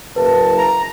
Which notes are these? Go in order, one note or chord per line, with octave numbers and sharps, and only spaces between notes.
F#1 B4 A5
A#5